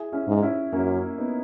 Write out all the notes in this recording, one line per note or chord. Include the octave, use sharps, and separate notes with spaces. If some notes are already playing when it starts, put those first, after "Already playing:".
Already playing: E4 G#4
C#4 E4
G#2
C#4 E4
F#2 A#3 C#4
B3 D#4